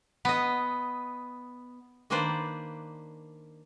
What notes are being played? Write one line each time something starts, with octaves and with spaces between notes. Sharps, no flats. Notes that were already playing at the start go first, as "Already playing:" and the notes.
B3 D#5
D#3 A#3 D4 B4 C5 D5